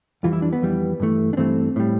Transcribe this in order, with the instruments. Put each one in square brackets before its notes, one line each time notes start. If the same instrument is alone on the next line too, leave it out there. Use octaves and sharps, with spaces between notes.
[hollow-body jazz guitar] F2 E3 G3 F4
E4
D4
B3
F2 E3 G3
G2 E3 A3
D4
G2 E3 A3 C4
A2 G3